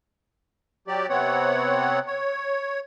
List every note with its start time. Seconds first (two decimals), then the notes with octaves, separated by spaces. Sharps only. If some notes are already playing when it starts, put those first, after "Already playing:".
0.87 F#3 G4 D5
1.09 C3 B3 C4 C#5 F#5
2.07 C#5